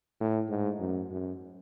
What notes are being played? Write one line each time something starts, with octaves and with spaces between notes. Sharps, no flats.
A2
G#2
F#2
F#2